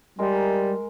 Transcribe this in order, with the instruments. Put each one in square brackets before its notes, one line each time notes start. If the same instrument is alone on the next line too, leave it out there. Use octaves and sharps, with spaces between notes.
[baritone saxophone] G3 [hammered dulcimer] G#3 A#4